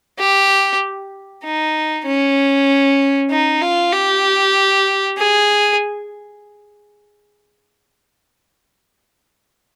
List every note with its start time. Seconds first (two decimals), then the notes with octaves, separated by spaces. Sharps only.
0.19 G4
1.44 D#4
2.06 C#4
3.31 D#4
3.61 F4
3.93 G4
5.18 G#4